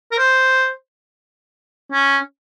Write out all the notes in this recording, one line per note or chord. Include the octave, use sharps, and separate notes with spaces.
A#4
C5
C#4